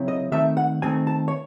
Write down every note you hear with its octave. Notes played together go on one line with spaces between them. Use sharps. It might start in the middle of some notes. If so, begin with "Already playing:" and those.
Already playing: C#3 F#3 C4 E4
D#5
D#3 A3 C4 E5
F#5
D#3 A3 C4 G#5
A5
C#5